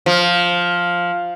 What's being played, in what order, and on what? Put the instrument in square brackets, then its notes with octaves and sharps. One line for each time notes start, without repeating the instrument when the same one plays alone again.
[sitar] F3